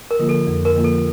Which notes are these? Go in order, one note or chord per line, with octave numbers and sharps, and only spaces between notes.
A#4
D3 F3 A#3 F4
A4
F2
A#4
D3 F3 A#3 F4
A4